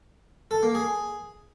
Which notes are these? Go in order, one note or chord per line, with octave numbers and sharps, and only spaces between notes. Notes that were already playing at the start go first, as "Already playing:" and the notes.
A4
A#3
G#4